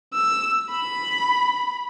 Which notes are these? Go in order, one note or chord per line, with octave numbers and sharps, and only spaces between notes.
E6
B5